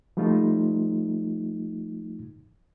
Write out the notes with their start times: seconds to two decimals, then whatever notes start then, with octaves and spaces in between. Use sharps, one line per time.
0.17 F3 G3 A3 D#4 F4